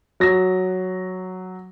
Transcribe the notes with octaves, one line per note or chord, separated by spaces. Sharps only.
F#3 A#6